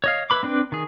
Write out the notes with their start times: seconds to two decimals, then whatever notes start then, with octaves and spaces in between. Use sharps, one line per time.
0.04 C#5 D#5 F5
0.30 E4 B4 B5 D6
0.43 C4 D4 B4 G5
0.72 D#3 G#4